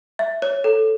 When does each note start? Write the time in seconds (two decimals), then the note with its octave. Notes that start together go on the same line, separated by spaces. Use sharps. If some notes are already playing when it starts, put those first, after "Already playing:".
0.19 E5
0.42 C#5
0.64 A4